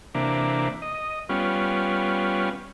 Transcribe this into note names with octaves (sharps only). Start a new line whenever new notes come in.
C3 E3 A#3 D4
D#5
G3 B3 C#4 F4